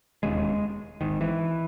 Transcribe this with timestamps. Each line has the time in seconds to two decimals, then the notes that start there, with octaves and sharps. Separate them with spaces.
0.23 E1 D#2 C#3 G#3
1.01 G#1 G#2 D#3
1.21 E3